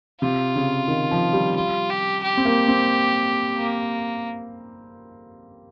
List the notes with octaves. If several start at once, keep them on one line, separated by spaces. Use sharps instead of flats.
C3 F4
C#3
D#3
F3
G3
F4
G4
G4
C4
A#3
C4
A#3